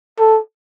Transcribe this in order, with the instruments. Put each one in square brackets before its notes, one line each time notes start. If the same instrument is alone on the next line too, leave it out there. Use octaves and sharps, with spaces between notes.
[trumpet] A4